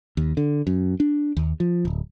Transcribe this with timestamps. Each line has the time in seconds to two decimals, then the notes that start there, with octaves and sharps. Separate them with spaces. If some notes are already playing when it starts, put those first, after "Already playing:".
0.17 D#2
0.37 D3
0.67 F#2
1.00 D4
1.37 D#2
1.60 F3
1.85 D1